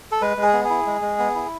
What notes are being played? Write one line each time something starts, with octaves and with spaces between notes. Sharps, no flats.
A4
G#3 B4
G#3
G#4
B3
G#4
E4
G#3
G#3
B3
E4